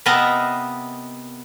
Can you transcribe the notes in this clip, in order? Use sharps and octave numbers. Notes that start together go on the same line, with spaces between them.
C3 B3 A#4 D#5 E5 A5